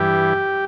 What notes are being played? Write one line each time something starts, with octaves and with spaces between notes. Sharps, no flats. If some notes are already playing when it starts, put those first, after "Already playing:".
Already playing: G2 E3 G4